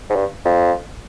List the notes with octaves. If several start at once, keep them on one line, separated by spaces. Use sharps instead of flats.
G#2
G2
F2